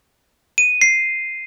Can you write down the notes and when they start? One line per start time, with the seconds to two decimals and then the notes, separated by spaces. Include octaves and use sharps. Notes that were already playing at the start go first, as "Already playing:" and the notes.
0.58 D#7
0.81 C7